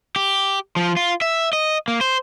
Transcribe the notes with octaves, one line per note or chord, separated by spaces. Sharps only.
G4
F3
F4
E5
D#5
A#3
C5